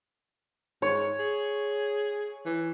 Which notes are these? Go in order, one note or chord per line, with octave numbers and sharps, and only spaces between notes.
G#2 C#5
G#4
E3